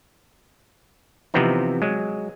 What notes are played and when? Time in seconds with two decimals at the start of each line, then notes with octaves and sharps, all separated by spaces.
1.34 C3 E3 F3 B3 C4 D#4
1.82 F#3 G#3